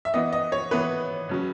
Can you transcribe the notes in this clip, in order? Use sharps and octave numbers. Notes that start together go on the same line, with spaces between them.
E5
E3 B3 D#5
D#5
C#5
E3 B3 B4
C#3 F#3 C#4